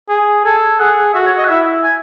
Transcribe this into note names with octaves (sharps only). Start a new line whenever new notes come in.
G#4
A4 G#5
G#4 F#5
F#4 E5
C#5
D#5
F#5
E4 E5
G#5